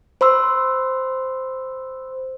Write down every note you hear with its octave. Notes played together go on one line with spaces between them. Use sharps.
C5 B5 C6 E6